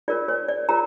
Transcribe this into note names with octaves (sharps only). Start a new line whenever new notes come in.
F4 A#4 C#5 D5
C#5
D5
F4 A#4 C#5 A#5